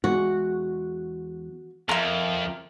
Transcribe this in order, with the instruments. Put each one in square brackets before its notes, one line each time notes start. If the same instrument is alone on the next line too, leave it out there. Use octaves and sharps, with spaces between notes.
[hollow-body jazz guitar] E2 G#3 [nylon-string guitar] F#4
[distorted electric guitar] F2 [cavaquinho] A#4 E5 [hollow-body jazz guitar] C6